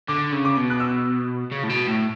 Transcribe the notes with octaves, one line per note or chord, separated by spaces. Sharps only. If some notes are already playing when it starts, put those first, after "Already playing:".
D3 D6
C#3
D6
B2
F#6
E6
C#3
A2
B2
A2